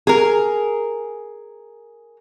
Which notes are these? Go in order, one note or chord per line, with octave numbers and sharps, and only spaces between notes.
G#4 A#4